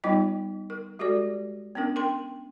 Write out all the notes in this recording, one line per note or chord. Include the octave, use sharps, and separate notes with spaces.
G3 B3 D#4 F4 D#5 G5
A#4
G#3 F#4 G4 A4 D5
B3 C#4 D4 A#4
A#4 G5 C6